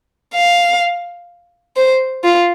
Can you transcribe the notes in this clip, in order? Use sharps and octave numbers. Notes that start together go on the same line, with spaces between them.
F5
C5
F4